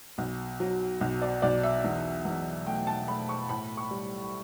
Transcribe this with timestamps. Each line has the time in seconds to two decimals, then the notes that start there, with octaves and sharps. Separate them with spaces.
0.18 B1
0.60 F#3
1.01 B1
1.22 D5
1.42 B1 D5
1.63 E5
1.84 E2
2.25 E2
2.67 A3 G5
2.87 A5
3.08 A3 B5
3.29 C#6
3.49 A2 B5
3.77 C#6
3.91 G3